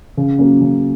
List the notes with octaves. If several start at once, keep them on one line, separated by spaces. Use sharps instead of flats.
C#3
F#3 A#3 C#4
C#3